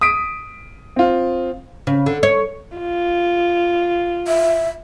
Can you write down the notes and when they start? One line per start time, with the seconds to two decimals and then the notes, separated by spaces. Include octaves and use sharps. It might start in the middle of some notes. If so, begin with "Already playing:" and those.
0.01 D#6 B6 D7
0.96 C4 F4
1.87 C#3
2.06 D3
2.23 C#5
2.77 F4
4.27 E5